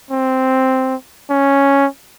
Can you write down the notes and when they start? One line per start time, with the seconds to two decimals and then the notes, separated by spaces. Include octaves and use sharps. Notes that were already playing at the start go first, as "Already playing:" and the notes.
0.11 C4
1.30 C#4